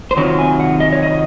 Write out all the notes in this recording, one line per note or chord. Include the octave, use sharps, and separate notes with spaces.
C5
C3 D#3 F#3 C4 F4 C#5
G#5
F#5
D#5
C#5
D#5